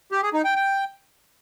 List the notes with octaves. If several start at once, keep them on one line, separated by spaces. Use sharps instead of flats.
G4
G#4
D#4
G5
G5